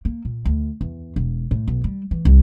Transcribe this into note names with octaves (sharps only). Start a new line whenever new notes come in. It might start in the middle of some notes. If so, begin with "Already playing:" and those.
A#3
A#2
D2
E2
E1
A2
B1
G3
E3
C2